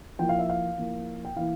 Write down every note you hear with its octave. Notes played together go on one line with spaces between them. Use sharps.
F3 A#3 E4 G5
F5
E5
F5
F3 A#3 E4
G5
E3 A#3 E4 F5